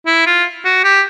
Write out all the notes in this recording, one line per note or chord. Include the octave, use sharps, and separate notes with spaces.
E4
F4
F#4
G4